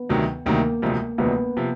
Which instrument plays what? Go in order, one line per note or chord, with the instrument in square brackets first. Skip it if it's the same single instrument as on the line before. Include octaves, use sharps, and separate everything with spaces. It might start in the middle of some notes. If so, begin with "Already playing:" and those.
Already playing: [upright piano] B3
[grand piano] D2 C3 D#3 F#3
[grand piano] D2 C3 D#3 F#3 [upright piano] A#3
[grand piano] E1 D2 C3 F3
[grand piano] E1 D2 C3 F3 [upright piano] B3
[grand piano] C3 F3